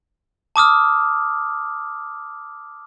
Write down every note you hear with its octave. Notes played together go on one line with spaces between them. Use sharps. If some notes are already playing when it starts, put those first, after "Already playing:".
A5 D6 D#6 F6